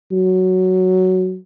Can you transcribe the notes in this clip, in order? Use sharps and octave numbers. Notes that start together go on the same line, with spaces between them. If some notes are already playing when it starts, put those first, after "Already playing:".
F#3